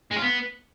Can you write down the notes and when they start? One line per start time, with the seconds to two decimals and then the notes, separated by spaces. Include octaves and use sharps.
0.11 G#3
0.16 F4
0.22 B3